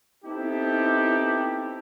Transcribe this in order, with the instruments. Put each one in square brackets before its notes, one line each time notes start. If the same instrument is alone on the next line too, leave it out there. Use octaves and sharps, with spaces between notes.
[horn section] B3 C4 D#4 E4 G4 A4